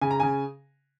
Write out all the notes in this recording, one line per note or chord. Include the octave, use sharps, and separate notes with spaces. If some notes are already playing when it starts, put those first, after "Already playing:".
C#3 G#5
A#5
C#3 G#5